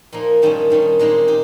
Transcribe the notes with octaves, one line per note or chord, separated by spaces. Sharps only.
A#2 F3 A#3 D#4
G2 D#3 G3 C#4
G2 D#3 G3 C#4
A#2 G#3 C4 D#4 G4
D#4 G4